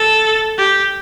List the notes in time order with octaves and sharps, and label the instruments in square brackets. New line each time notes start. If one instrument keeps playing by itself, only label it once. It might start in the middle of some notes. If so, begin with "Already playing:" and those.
Already playing: [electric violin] A4
G4